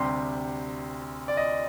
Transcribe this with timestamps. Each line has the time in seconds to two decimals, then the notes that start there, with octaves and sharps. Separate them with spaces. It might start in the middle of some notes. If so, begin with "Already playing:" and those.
Already playing: D2 C3 G3 C6
1.28 D5
1.37 D#5